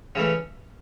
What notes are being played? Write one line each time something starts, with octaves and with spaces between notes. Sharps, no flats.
C#3 E3 A3 C#4